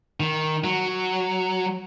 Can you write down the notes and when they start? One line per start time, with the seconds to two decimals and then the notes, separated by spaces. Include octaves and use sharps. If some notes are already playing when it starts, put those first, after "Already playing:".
0.20 D#3
0.64 F#3